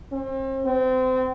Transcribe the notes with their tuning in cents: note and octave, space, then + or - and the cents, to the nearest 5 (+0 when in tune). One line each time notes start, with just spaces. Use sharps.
C4 +40
C4 -25